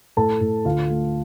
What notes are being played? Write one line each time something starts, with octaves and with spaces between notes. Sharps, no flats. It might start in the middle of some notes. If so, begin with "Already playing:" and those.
A2 A4 A5
A2
D2 F4 F5
A3